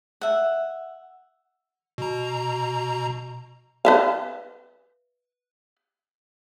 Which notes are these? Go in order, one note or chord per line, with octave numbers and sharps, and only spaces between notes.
E5 F#5
B2 A#5
B4 E5 F5